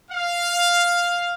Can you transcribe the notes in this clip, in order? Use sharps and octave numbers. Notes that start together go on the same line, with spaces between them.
F5